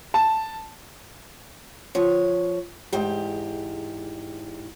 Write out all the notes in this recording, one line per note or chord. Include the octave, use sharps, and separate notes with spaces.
A5
F3 C#5
E2 G#2 G4